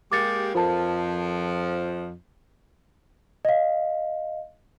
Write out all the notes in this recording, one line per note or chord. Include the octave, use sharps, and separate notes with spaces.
G#3 A#3 G4 D6 A6 C#7
F2 F3 F4 A#4 A5
D#5 F5